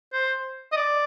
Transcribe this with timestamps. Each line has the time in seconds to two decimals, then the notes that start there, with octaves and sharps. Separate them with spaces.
0.13 C5
0.72 D#5
0.77 D5